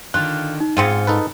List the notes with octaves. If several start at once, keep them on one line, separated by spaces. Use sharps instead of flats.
D3 D#3 F4 F#6
D#4
G#2 C#3 C4 F4 C#7 D#7
D#4 A4 B4